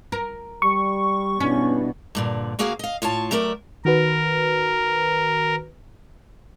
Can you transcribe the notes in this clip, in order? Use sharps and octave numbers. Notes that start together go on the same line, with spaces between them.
A#4
G3 C#6
G2 B2 B3 C#4 D4 E4
G2 A#2 D3
D2 A#3 F#4 G#4 F5
D#5 F5
A2 F4 C#5 A5
F#3 A3 A#4 D5 E5
D#3 F#4 A#4 B4